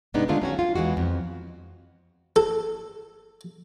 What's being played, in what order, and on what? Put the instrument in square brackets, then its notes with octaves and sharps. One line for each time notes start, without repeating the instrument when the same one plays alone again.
[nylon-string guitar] G#2 C3 G#3 B3 D4 D#4
D3 D#3 G#3 A3 D4 F4
F#3 C#4 F#4
F4
E2 E3 G#3 F#4
F2
[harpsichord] A4